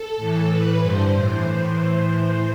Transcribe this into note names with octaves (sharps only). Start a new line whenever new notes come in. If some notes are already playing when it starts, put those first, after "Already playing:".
Already playing: A4
A2 E3
A2 E3 B4
G2 D3 C5
A2 E3 C5